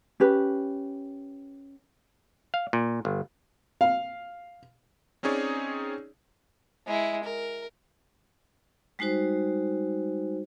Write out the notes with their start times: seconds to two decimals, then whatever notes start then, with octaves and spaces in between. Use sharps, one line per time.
0.20 C#4 G4 B4
2.54 F5
2.73 A#2
3.05 G1
3.81 F5
5.23 C4 C#4 D#4 G#4 C#5 D5
6.87 G#3 E4
7.24 A#4
8.99 G3 G#3 D#4 F#4 C5